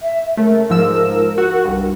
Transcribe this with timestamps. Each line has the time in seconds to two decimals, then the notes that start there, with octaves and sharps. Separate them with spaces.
0.02 E5
0.37 C#3 A3 A#4
0.70 G#2 F3 E6
1.38 F#4
1.65 C2 G2